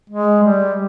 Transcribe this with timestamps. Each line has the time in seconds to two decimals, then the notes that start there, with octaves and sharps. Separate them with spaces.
0.09 G#3
0.43 G3